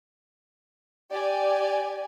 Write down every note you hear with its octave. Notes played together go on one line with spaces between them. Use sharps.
G4 D5 G#5